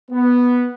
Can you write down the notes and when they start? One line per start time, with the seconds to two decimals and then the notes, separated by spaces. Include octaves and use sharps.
0.11 B3